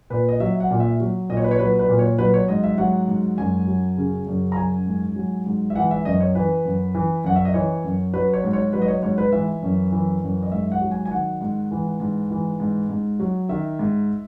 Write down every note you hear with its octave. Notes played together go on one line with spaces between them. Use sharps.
A#2 B4
D#5
F#3 E5
F#5
A#2
E5
F#3
A#2 D#5
C#5
B4
C#5
F#3 B4
B4
A#2
C#5
F#3 B4
C#5
G#2 D#5
E5
F#3 F#5
G#2
F#2 G#5
F#3
C#3
F#2
A#5
F#3 G#5
G#2
F#3
G#2
E5
E3 F#5
E5
F#2 D#5
C#5
E3 B4
F#2
E3
F#2 F#5
E5
D#5
E3 C#5
F#2
F#3 B4
C#5
G#2
C#5
F#3 B4
D#5
C#5
G#2 C#5
B4
E3 E5
F#2
E3
F#2
D#5
G#2 E5
F#5
F#3
G#5
G#5
D#3 F#5
G#2
E3
G#2
E3
G#2
G#2
F#3
D#3 E5
G#2